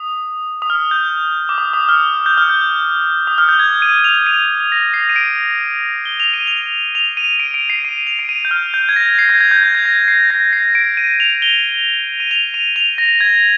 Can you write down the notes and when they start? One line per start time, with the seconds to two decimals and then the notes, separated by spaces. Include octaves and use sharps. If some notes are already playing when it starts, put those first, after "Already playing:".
Already playing: D#6
0.62 D#6
0.70 F6
0.91 G6
1.49 D6
1.58 D#6
1.73 D#6
1.89 F6
2.26 G6
2.37 F6
2.49 G6
3.27 D#6
3.38 F6
3.49 G6
3.59 G#6
3.82 D#7
4.04 F7
4.27 D#7
4.72 A#6
4.94 C7
5.09 D#7
5.16 D7
6.05 G7
6.20 F7
6.34 D#7
6.47 F7
6.95 F7
7.17 D#7
7.40 D7
7.54 D7
7.70 C7
7.85 D#7
8.07 F7
8.19 D7
8.29 D#7
8.45 G6
8.51 F6
8.74 G6
8.89 G#6
8.96 A#6
9.19 C7
9.29 G#6
9.41 G#6
9.51 G6
9.63 G#6
9.75 G#6
9.85 A#6
10.08 C7
10.30 A#6
10.53 C7
10.75 D7
10.97 D#7
11.20 F7
11.42 G7
12.20 D#7
12.31 F7
12.54 D#7
12.76 F7
12.98 A#6
13.21 G#6